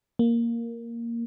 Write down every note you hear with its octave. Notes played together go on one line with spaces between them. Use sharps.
A#3